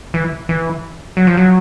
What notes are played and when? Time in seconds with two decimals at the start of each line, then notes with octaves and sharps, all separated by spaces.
0.14 E3
0.49 E3
1.17 F#3
1.27 F3
1.37 F#3